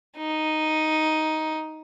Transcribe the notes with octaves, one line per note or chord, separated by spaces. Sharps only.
D#4